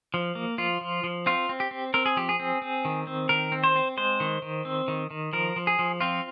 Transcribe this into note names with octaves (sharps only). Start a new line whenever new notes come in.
F3
A#3
F3 F4
F3
F3
C4 F4
C4
G4
C4
C4 A#4
G#4
F3 G4
G#4
C4
C4
D#3
C4
D#3 A#4
C4
C5
C4
G#3 C5
D#3
D#3
C4
D#3
D#3
F3 A#4
F3
G#4
F3
C4 F4